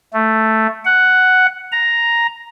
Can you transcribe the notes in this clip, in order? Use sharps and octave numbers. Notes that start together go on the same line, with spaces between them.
A3
F#5
A#5